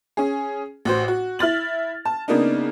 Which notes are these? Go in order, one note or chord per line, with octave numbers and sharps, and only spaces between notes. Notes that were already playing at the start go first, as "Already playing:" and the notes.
C#4 G#4
A1 F#4 C5
F#4
E4 F6 A6 F#7
A5
C#3 A#3 B3 D4 D#4